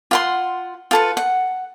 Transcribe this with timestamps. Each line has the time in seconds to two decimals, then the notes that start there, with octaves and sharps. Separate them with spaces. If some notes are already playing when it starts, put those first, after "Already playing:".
0.11 F4 F#5 C6
0.91 F4 A4 B4
1.17 F#5